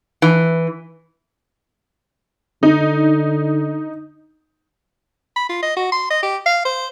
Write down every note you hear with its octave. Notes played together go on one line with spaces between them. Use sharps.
E3
D3 D#4
B5
F4
D#5
F#4
C6
D#5
G4
F5
C5